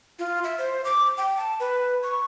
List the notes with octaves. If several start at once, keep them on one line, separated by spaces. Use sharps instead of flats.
F4
E5
C5
D6
G5
A5
B4
C#6